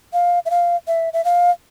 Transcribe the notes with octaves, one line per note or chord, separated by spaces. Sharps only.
F5
E5
F5
E5
E5
F5